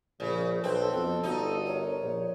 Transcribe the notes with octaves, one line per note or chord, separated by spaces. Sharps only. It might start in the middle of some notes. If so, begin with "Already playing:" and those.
A#1 C#3
B1 C4 A4 B4
F2 B3
G1 D#4 F#4
A#4 C#5
A#1